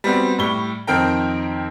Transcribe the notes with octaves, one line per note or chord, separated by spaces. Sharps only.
G3 B3 C4 F#4
A2 G3 C#6 G7
F2 D#3 C4 A#4 G5 A#5